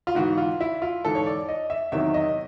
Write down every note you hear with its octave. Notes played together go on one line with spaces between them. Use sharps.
F4
G#2 E3 F#4
F4
E4
F4
G#2 E3 A4
C#5
D5
D#5
E5
E2 C3 D#3 F#3 E5
D#5